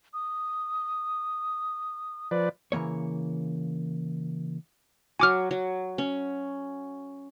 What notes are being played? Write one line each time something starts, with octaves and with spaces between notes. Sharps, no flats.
D#6
F3 B4 D5
C#3 E3 F3 A#3 C#5
F#3 F#4 G#5 D6 F6
F#3
C#4